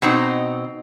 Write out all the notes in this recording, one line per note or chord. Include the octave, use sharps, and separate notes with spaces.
B2 C4 D#4